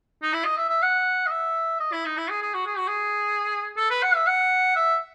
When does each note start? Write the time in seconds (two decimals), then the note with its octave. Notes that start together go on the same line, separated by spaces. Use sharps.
0.22 D#4
0.33 E4
0.45 D#5
0.57 E5
0.69 E5
0.82 F#5
1.26 D#5
1.31 E5
1.80 D#5
1.92 E4
2.05 D#4
2.17 E4
2.30 G#4
2.41 G#4
2.54 F#4
2.66 G#4
2.78 F#4
2.87 G#4
3.77 A4
3.90 B4
4.02 F#5
4.15 E5
4.26 F#5
4.76 E5